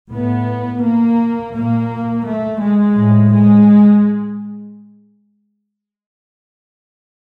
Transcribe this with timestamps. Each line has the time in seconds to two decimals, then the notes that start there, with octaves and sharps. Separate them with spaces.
0.11 A2 B3
0.83 A#3
1.53 A#2 A#3
2.25 A3
2.60 G#3
2.96 A2
3.31 G#3